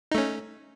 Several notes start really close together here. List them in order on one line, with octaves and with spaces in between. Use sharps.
D#4 A3 C#4